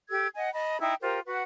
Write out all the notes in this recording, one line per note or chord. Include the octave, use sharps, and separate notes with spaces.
G4 A4 E6 G#6
D#5 F#5 G#5
D#5 A5 B5
D#4 E4 G5
F4 G4 A#4 C5
F#4 B4 F#5